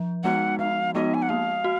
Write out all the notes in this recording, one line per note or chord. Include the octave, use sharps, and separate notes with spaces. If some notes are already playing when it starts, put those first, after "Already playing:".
Already playing: F3
G#3 B3 D#4 F#4 F#5
F3 F5
G#3 B3 D#4 F#4 D#5
G#5
F#5
A#3 F5
F#4